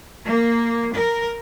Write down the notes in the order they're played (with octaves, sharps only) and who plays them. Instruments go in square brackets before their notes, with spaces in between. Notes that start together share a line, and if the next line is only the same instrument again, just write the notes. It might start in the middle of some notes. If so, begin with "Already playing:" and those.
[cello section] A#3
A#4